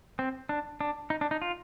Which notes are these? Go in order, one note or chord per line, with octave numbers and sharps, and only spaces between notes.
C4
D4
D4
D#4
D4
D#4
F4